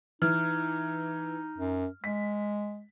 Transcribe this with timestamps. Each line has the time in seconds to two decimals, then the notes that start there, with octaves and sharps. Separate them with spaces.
0.22 E3 D#4 F6
1.58 F#2
2.04 G#3 B6